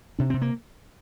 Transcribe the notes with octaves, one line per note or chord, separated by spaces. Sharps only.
C3 D4
C3 C4
A#3